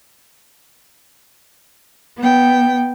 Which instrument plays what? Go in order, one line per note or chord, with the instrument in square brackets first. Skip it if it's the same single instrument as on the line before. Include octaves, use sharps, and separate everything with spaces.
[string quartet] B3 G5